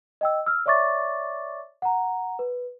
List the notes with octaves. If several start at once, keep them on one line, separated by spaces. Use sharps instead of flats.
D#5 G5 E6
E6 F6
C#5 D5 E5 C#6 D6 A6
F#5 A#5
B4